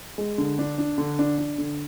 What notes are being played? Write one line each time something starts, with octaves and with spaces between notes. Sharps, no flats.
G#3
D3
D4
D4
D3
D4
D4
D3